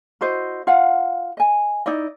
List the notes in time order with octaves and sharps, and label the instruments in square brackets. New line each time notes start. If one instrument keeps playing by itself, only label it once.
[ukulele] E4 F#4 C5 D#5
F4 F5 F#5
D#5 G#5
D#4 E4 D5 D#5